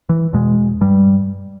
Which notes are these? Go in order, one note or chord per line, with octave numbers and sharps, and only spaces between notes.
E3
E2 B2 G#3
G2 G3